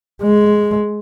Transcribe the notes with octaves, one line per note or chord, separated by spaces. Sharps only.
G#3